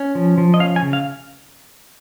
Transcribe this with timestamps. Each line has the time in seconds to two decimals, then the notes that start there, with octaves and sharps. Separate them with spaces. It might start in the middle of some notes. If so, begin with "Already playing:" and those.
Already playing: C#4
0.15 F3
0.38 F3
0.54 D#5
0.59 C#4 F5
0.76 G#5
0.82 C#3
0.93 F5